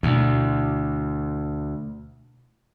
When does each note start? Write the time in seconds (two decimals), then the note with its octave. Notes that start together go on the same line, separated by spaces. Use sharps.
0.03 D2 B2 E4